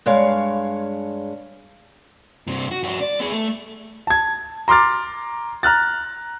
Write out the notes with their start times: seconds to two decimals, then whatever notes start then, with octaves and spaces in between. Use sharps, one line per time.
0.06 G2 G#3 C#5 F5
2.47 G2 C3
2.71 F#4
2.83 G2 F#4
3.01 D5
3.20 B3 G#4
3.32 A3
4.07 A5 G#6
4.68 A#5 C6 D6 F6 A6
5.63 A#5 F6 F#6 A6